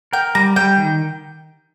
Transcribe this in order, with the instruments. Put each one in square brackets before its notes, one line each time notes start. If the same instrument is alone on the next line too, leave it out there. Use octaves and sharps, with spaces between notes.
[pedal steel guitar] A#4 [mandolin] G5
[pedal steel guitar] G3 [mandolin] A#5
[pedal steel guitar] G3 [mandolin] G5
[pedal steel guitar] D#3